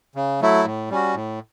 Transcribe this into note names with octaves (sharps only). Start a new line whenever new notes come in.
C#3
F#3 A3 E4
A2
G3 C#4 F#4
A2